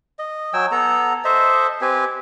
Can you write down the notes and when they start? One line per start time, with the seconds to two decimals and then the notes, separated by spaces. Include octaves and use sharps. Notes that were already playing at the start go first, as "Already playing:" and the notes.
0.19 D#5
0.53 F#3 G5 G#5 E6
0.72 B3 A4 A#5
1.24 A4 C5 D#5 E5
1.81 C4 G4 B4 G#5